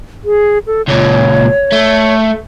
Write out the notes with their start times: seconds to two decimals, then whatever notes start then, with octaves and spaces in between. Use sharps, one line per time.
0.24 G#4
0.67 A4
0.88 C#2 A#2 C#5
1.72 A3